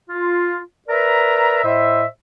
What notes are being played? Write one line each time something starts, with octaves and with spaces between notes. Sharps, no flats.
F4
A#4 B4 D5 E5 A#5
A2 C5 D#5 E5